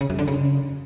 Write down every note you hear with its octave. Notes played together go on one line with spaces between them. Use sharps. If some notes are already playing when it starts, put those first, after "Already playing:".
C#3
F#2
D3
C#3